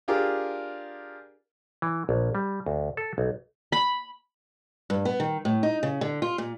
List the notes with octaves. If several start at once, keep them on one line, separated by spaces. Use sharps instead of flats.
D4 F4 G4 G#4 A#4
E3
A#1
G3
D2
A4
B1
B5
G2
B3
D#3
A2
D#4
C#3
D3
F4
A#2